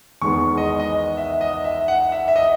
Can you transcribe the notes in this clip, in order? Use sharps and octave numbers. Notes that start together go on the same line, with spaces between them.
E2 D#3 G#3 B3 C#6
D#5
D#5
E5
D#5
E5
F#5
E5
E5
D#5